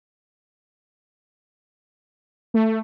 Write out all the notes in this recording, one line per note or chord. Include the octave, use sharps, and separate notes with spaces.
A3